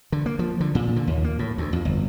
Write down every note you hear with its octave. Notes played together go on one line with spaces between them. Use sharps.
D3
A#3
F3
D3
A#2
D3
D#2
A#3
A2
D2
F2
G1